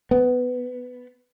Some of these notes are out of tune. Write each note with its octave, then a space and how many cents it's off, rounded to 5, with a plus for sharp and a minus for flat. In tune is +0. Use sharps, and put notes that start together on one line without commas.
B3 +10